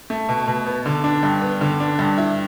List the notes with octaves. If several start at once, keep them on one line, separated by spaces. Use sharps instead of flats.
A3
B2
B2
B3
D3
D4
G2
B3
D3
D4
G2
E4